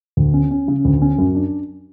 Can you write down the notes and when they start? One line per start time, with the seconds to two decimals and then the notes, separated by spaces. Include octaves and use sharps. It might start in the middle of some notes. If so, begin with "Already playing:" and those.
0.17 D2
0.34 C#4
0.51 C#4
0.68 C#3
0.85 D2
1.02 C#4
1.18 F#2
1.35 D4